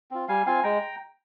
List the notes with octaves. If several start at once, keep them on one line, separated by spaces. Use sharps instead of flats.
C4 F4
G3 F5 G#5
C4 F4 F5 G#5
G#3 G5 A#5